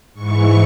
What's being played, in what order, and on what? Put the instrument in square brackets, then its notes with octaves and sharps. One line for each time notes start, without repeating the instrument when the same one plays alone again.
[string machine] G#2 E3 C#6